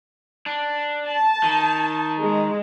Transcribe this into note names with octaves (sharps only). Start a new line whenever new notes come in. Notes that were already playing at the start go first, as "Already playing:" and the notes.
D4
A5
D#3
G#3